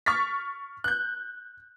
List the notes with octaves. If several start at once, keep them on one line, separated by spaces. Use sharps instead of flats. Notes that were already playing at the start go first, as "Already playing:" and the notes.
C#6 F6 A6 B6
F#6 G6